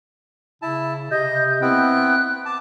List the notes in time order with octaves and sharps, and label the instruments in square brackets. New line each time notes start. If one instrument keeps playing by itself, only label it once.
[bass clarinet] C#3 [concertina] E4 A5
[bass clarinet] C3 [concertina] D#5 [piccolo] G6
[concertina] B3 E4 G5 [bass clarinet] C4 [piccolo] F#6
[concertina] A5 [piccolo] D6